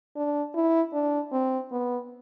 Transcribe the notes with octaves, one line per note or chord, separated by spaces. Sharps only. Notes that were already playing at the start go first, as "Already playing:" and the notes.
D4
E4
D4
C4
B3